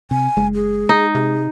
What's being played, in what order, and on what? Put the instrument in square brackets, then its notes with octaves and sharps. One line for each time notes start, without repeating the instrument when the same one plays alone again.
[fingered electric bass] C3 [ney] G#5
[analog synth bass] F#1 [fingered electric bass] G#3
[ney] G#4
[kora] D#4
[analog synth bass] C3 [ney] G#4